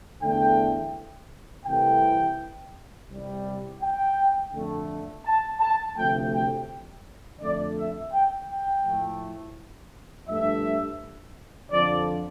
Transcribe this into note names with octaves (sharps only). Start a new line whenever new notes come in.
E2 D3 A3 G5
C2 C3 E3 A3 G5
C2 C3 G3
G5
F2 D3 A3
A5
A5
D2 C3 F3 A3 G5
G5
F2 D3 A3 D5
E5
G5
G5
A2 F3 A3
G2 F3 A3 E5
F2 D3 F3 D5